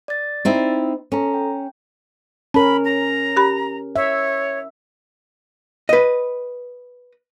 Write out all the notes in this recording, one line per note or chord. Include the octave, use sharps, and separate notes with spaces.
D5 A6
C4 D#4 E4
C#4 A4 A#5
G5
C#4 A#4 A5 B5
A#5
G4 B5
C#5 E5
B4 D#5